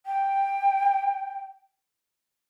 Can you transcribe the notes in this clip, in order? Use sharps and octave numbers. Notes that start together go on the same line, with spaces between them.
G5